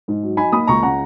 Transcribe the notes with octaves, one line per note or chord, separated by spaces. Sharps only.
G#2
F#3
D#4 G#5 B5
A#3 B5 D#6
C#2 A#5 C#6
C#3 F#5 A#5